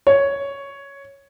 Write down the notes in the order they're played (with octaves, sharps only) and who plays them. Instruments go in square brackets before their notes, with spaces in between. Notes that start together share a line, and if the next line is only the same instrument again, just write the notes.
[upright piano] C#5